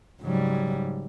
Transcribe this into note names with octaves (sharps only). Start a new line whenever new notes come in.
G#2 C#3 F#3 G3